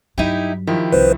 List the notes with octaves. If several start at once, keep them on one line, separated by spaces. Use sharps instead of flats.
G2 F#3 D#4 E4 G4
D#3 F3 E4 G4
C2 B4 C5